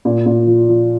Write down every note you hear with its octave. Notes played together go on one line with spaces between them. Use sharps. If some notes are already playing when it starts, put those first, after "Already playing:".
A#2
A#2
F3
F3